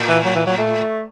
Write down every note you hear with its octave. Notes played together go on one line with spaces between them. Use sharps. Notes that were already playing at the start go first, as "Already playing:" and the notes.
Already playing: A2
E3
F#3
E3
F#3
A3